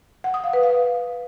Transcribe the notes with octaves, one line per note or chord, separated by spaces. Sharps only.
F#5
D#6
F5
B4
F5